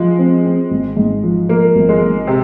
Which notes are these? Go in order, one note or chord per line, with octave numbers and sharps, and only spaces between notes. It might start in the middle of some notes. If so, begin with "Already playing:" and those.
Already playing: F3 G#3
C4
C4
G#1
G#2
F3
F3 A#3
G#1
G#3
G#2
C3